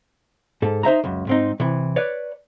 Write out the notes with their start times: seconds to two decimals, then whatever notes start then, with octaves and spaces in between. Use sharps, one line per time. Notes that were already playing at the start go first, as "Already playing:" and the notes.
0.62 G#2 A4
0.83 D#4 C5 E5 A#5
1.04 C#2 F#2
1.27 G#2 C4 D#4
1.60 C3 E3
1.96 B4 C#5 D5